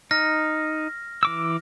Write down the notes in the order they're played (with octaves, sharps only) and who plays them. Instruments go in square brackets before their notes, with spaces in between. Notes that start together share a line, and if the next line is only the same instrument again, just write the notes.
[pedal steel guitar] D#4 [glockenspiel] F6 A#6
[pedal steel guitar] E3 D6 E6